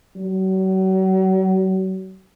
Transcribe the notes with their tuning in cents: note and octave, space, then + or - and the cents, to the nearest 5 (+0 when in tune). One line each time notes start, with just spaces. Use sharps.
F#3 +35